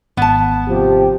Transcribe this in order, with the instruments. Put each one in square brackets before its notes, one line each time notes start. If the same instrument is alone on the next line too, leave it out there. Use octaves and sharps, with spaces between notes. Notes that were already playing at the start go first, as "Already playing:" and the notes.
[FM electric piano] G#1 [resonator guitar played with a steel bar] B3 A5
[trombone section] C3 F3 G4